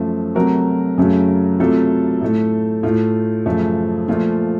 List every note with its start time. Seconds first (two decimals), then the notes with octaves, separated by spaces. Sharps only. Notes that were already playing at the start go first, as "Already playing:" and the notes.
Already playing: F#2 F3 A3
0.35 C3 F#3 A3 F#4 A#4
0.98 F#2 C#3 F#3 A3
1.60 C3 F#3 A3 F4 A4
2.21 A2 A3
2.83 A2 A3 F4
3.46 F#2 C#3 F3 A3
4.08 A#2 F3 A3 F4